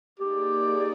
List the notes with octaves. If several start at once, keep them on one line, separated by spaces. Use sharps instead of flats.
A#3 D#4 G4 G#4 D5